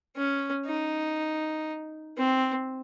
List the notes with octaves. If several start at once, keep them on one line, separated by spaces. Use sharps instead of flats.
C#4
D#4
C4